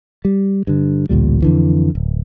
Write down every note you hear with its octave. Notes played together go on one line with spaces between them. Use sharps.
G3
G2 D3
A1 D2 A#2 G3
F2 D3 E3
D1